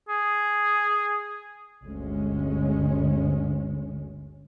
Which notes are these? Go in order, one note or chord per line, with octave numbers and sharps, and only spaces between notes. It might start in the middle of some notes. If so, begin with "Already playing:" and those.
G#4
G1 D2 G#3 C#4